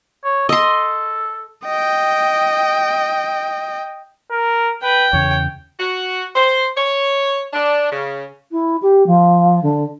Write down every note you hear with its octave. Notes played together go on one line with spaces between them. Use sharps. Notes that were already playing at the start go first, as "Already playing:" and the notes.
C#5
A4 D#5 C6
D#5 G5
A#4
B4 G5
E2 C#3 C#5
F#4
C5
C#5
D4
C#3
E4
G4
F3
D3